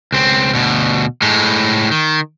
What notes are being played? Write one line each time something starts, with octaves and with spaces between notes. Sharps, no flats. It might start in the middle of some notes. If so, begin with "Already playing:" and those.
C#2 C4
D2 B2
A2 G#3
D#3